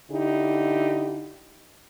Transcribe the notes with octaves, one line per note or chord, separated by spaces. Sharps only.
D3 D#4 E4 G4